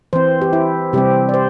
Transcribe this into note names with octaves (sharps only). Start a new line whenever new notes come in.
E3 C4 C5
G4
E4
C3 G3 C4 G4
D5
C5